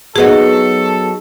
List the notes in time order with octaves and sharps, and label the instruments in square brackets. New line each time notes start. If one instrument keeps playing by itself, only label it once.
[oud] F#3 B3 D#4 [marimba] G#4 [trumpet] A4